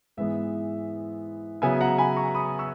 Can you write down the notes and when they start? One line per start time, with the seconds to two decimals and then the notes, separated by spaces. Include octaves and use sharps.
0.17 G#2 E3 G#3 B3 E5
1.62 C#3 F#3 B3 E5 G#5
1.81 F#5 A#5
1.98 G#5 B5
2.16 A#5 C#6
2.34 B5 D#6
2.59 C#6 E6